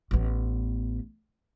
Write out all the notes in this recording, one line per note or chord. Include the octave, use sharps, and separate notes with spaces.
A1 B3